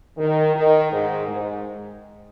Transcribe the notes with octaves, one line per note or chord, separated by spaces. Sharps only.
D#3
D#3
G#2
G#2